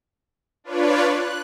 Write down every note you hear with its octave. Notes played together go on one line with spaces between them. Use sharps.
D4 F4 B4 C#5 D5
F#6